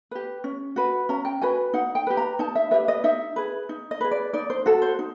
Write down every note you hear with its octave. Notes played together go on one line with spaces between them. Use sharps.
G4 B4
C#4
F#4 B4
C#4 A#5
G5
F#4 B4 G#5
D#4 F#5
G5
G4 B4
A#5
D#4 A5
E5
G4 B4 E5
D#5
D#4 E5
G#4 B4
D#4
D#5
G#4 B4
D5
D#4 D5
C5
F#4 A4
C5
D#4